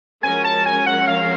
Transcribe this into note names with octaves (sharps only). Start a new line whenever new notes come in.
F3 G#3 C#4 F#4 A#4 G#5
A5
G#5
F#5
F5